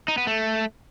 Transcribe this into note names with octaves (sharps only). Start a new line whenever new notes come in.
D#4
B3
A3